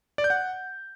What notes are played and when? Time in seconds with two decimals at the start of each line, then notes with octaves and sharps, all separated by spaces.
0.18 D5
0.24 G6
0.30 F#5